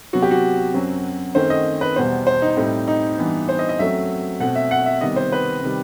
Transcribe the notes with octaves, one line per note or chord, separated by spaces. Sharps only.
C3 F#3 B3 F#4
G4
F#4
F#2 F#3 C4
F#2 D#3 A3 C4 C5
D#5
B4
E2 B2 G3 B3 C5
C5
D#4
A2 G3 C4
D#4
G2 E3 G3 B3
C5
D#5
D#5
F#2 F#3 A3 C4 E5
B2 A3 C4 F#5
E5
F#5
E5
C3 D#3 G3 B3 D#5
C5
B4
C3 D#3 G3